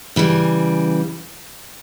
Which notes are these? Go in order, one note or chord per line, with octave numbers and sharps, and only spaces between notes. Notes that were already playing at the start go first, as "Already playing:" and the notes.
C#3 E3 G3